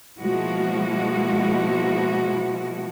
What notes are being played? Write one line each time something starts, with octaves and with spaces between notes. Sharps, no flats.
B2 F3 G#3 A#3 E4 F#4